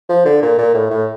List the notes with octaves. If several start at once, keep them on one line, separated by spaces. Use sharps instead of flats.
F3
D3
A#2
A#2
A2
A2